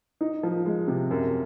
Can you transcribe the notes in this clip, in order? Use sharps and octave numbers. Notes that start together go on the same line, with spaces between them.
D#4
F3
G#3
C3
F#2